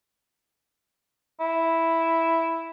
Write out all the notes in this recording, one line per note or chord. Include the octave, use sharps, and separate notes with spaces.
E4